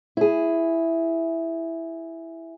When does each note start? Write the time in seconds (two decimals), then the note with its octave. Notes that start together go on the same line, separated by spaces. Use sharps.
0.17 E4 G#4